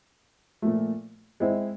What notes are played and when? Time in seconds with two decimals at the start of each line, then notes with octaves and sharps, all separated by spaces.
0.62 A#2 F3 A3
1.40 G#3 C4 E4